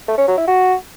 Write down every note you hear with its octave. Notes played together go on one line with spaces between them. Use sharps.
A3
C#4
F#3
E4
F#4